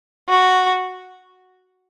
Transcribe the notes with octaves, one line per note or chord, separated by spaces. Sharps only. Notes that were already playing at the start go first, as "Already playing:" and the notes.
F#4